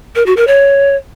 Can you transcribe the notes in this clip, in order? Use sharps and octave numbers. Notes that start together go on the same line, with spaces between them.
A#4
F#4
A#4
C#5